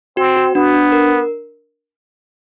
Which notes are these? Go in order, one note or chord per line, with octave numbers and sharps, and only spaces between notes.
C4 F#4
F#4
B3 D4
D4
A#4